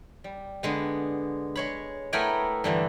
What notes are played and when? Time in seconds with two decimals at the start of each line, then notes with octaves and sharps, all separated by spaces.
0.24 G3
0.63 D3 G#3 B3
1.56 G#3 C#5 B5
2.13 A3 B3 E4 A#4 G5 G#5
2.64 G2 D3 E3